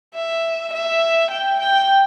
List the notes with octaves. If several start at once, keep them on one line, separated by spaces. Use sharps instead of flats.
E5
E5
G5
G5